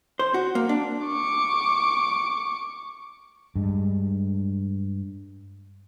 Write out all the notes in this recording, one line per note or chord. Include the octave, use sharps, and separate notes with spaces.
C5
F#4
A#3
D4
C#6 D6
G2 G#3